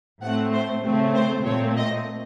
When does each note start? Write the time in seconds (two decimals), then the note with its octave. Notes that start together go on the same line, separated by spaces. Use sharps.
0.22 A2 A3 C4 F#5
0.53 C5
0.84 C#3 A3 C4
1.14 C5
1.45 A#2 A3 C4 C#5
1.76 D#5